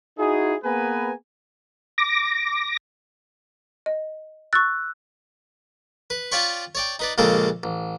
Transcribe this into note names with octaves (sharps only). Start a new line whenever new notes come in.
D#4 E4 F#4 G#4
A#3 B3 G#4 B4 G#5 A#5
D6 A#6
D#5
C#6 E6 F#6 A6
B4
F4 C#5 D5 G5 B5 C#6
C#5 D5 G5
D#4 B4 D5
A#1 C#3 G#3 A#3 A4 G5
A1